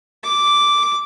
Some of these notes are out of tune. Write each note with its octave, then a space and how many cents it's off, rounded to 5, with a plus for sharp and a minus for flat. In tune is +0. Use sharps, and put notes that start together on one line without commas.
D6 -5